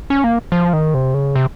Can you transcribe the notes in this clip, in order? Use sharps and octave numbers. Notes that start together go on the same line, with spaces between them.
C#4
A#3
F3
D#3
C3
C#3
C3